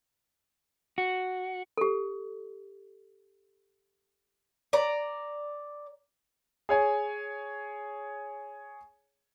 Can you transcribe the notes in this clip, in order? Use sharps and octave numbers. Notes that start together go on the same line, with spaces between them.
F#4
G4 A4
D5 A#5
G#4 C#5 G#5